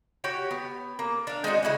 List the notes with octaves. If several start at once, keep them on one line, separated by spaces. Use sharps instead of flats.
F#4 G4 C#5 G5
B3
A#3
D4 F5
G#3 C4 D#4 F#4
C#3 E4 G#4 F#5